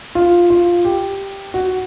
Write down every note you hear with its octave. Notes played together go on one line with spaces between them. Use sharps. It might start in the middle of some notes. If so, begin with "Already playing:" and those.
F4
F4
G4
F#4